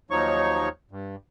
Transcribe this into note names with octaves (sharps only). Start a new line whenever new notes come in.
D#2 F3 F#3 D#4 C#5 C#6
G2